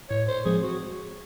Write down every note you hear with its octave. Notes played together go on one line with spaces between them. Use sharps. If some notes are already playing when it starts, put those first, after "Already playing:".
A2 C#5
C5
F3 G#3 C4 G#4
F#4